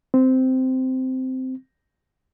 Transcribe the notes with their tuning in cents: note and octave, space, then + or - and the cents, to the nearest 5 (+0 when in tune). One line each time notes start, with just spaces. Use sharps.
C4 -10